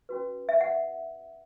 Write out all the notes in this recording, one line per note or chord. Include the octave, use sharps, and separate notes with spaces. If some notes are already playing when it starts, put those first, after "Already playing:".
C#4 F#4 B4
E5
F#5